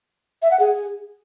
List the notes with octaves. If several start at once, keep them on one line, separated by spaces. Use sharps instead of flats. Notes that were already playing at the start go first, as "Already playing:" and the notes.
E5
F#5
G#4